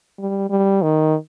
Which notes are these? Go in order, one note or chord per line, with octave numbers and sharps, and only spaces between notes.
G3
G3
D#3